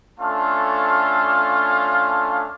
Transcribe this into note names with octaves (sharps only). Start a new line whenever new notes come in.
A3 C#4 D4 F4 A4 F5